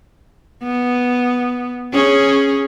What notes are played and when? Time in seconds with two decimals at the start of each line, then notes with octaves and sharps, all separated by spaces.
0.63 B3
1.93 C#4 G#4